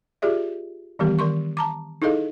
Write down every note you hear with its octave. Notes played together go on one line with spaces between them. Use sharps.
F4 G4 G#4 D5 E5
D#3 E3 G3 B3 G4 A#4
D#3 A#4 C6 C#6
A5 A#5 D6
D#4 E4 G#4 A4 D#5 F5